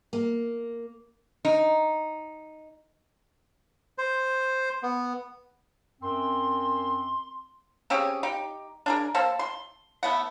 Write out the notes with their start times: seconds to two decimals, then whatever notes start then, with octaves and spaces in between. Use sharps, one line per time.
0.13 A#3
1.45 D#4
3.98 C5
4.83 B3
6.02 F#2 C4 C6
7.90 C4 C#4 G4 G#4
8.23 D#4 G4
8.86 D4 G#4 A#4
9.14 A#3 A4 C5
9.39 C6
10.03 A3 B3 F#5